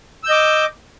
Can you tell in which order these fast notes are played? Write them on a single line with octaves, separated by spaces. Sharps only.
E6 G6 D#5 D6